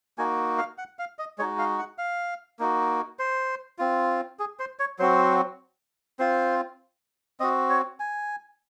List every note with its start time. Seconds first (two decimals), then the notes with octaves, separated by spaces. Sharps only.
0.18 A#3 D#4 F#4 G#5
0.58 F5
0.78 F#5
0.99 F5
1.19 D#5
1.38 G#3 D#4 F#4 C#5
1.58 F5
1.78 F#5
1.98 F5
2.59 A#3 D#4 F#4
3.19 C5
3.79 C4 F4
4.39 G#4
4.59 C5
4.79 C#5
4.99 F#3 C4 F#4 C5
6.19 C4 F4 C5
7.40 C4 F#4 D#5
7.70 C#5
8.00 G#5